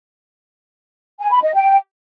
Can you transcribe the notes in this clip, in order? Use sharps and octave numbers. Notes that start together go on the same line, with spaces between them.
G#5
B5
D#5
G5